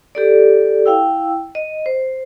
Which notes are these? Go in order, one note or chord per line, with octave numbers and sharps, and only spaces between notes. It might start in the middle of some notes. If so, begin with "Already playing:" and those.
G4 A4 D5
E4 F5 G5 E6
D#5
C5